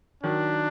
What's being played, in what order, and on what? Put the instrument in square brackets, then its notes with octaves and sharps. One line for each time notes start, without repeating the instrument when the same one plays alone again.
[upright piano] D#3 F#3 [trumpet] D4